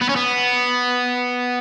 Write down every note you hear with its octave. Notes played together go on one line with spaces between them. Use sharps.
B3
C#4
B3